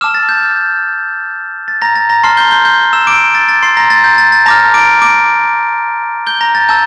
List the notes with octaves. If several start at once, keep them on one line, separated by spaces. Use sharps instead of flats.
A5 D6 E6 F6 E7
A6
G6
G6
A6
A#5 A#6
A6
A#5 A#6
A5 C6 F6 C7
G6 G7
G6 G7
G6 G7
E6 E7
D6 D7
A6
A6
C6 C7
A#5 A#6
A6
G6
A6
A6
A5 A#5 D6 F6 A#6
D6 D7
D6 D7
G6 G7
A#5 A#6
A6
A5 E6 G6